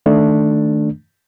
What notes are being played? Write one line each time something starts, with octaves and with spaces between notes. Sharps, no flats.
D#3 A3 D4